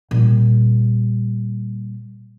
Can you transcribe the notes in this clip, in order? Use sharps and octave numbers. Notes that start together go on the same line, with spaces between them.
A#2 G3